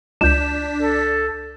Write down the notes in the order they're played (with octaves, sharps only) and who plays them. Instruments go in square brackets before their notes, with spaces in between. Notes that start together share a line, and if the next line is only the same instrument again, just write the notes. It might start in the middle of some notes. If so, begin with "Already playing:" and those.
[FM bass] C#2 [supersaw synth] D4 B6 [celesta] G6 E7
[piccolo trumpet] A4